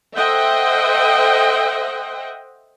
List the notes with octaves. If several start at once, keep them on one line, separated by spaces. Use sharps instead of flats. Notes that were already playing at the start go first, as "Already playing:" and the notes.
A4 C5 D#5 E5 F#5 G5